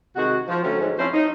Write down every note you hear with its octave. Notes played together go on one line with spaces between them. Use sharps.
C3 D#3 G#3 F#4
F3
D2 F#3 A3 C4 C#4
G#2
F3 C4 C#4 E4 F4 C5
D#4